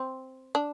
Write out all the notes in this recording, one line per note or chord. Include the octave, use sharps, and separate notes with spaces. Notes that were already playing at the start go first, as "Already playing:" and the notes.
Already playing: C4
D4